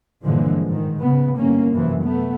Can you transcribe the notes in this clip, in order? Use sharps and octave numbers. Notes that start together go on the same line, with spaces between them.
G1 A#2 D3 E3 F3 G#3
G#2 D#3
C#3 B3
G1 A#3 C#4
F#2 C3 E3 F3
A3 B3